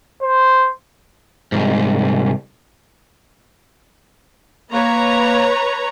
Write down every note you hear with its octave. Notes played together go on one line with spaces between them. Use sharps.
C5
C2 G#2
A#3 B4 C#5 A#5